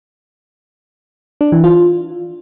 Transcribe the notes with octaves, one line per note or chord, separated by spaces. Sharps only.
D4
E3
F4